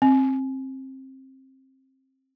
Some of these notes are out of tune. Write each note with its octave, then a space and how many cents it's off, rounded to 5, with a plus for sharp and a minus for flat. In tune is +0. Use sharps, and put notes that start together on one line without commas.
C4 +20